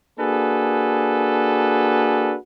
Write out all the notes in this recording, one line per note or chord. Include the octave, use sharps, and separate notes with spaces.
A#3 D4 F#4 G#4 A4 B4